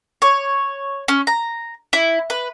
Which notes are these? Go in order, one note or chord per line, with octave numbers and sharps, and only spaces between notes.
C#5
C#4
A#5
E4
B4